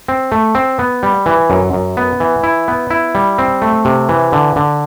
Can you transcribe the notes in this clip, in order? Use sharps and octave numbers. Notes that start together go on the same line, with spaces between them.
C4
A3
C4
B3
G3
E3
F#2
F#2
B3
E3
E4
B3
E4
G3
C4
A3
C3
E3
D3
D3